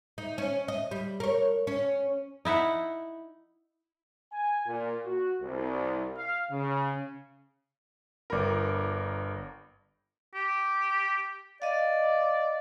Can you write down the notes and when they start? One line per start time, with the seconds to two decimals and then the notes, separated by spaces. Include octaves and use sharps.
0.18 D#4
0.38 C#4
0.68 D#5
0.91 G3
1.20 A#4 C#5
1.67 C#4
2.45 D#4 E4 E5 F#5
4.31 G#5
4.66 A#2
5.04 F#4
5.41 C2
6.15 F5
6.50 C#3
8.30 G1 A#4 B4 D5
10.35 G4
11.62 D5 D#5 F5